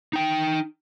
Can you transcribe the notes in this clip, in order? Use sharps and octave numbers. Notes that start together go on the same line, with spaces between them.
D#4 G5